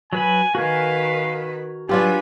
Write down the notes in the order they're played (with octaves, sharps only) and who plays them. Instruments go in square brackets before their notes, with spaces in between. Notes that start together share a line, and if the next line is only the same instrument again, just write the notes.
[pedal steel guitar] F#3 B4 B5 [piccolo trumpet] G#5
[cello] D#3 B4 [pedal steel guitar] F#4 A#4 G#5 [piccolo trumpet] F5
[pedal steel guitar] F#3 [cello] G3 B4 [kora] D4 F4 G4 [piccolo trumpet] G#5